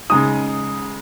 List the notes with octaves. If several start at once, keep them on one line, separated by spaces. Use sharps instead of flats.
C#3 G#3 D#4 D#6